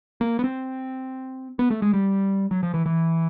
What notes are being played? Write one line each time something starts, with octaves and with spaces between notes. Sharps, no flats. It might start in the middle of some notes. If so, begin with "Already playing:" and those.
A#3
B3
C4
B3
A3
G#3
G3
F#3
F3
E3
E3